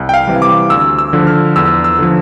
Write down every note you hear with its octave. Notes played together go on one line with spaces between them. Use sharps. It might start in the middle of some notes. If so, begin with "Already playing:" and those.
Already playing: C2
G5
F5
C3 E3 G3
D6
D2 E6
E6
D3 F3
F6
E2 E6
E6
D3 F3